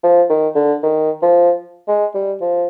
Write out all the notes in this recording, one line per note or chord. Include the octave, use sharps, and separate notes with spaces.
F3
D#3
D3
D#3
F3
G#3
G3
F3